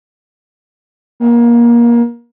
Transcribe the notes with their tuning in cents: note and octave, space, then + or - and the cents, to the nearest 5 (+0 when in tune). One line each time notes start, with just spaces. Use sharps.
A#3 +25